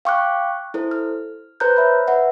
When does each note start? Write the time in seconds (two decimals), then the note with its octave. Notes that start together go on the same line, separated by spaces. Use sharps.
0.05 F5 G5 C#6 D6 F6 F#6
0.74 E4 A4 C5
0.91 F6
1.60 B4 C5 A#5 F#6 G6
1.76 C#5 E5 B5
2.08 B4 E5 F#5